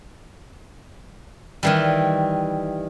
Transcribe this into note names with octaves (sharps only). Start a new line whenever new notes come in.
D#3 E3 G3